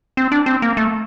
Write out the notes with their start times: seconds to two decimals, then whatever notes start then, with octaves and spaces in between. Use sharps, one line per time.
0.17 C4
0.32 D4
0.46 C4
0.62 A#3
0.77 A3